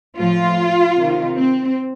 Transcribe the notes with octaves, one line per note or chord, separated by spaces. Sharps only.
A2 F3 F4
C3 D#3
C4